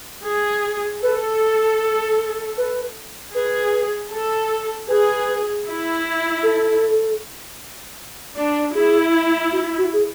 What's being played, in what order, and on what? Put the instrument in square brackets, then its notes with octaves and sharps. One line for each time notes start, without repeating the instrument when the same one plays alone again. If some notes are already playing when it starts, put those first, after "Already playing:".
[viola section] G#4
[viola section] A4 [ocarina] B4
[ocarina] B4
[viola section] G#4 [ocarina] B4
[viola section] A4
[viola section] G#4 [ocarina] B4
[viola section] E4
[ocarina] A4
[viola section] D4
[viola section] E4 [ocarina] G#4
[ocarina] F#4
F#4
G#4